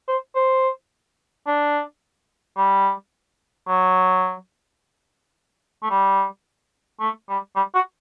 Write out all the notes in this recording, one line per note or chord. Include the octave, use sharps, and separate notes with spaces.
C5
C5
D4
G3
F#3
A3
G3
A3
G3
G3
F#4